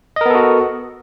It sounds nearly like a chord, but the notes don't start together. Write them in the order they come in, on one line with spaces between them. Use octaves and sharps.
D#5 A#4 B3 A4 F#4